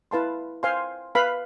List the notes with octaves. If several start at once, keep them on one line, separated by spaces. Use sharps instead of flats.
E4 B4 F5 A5 C6
C5 F5 G#5 C6
B4 F5 B5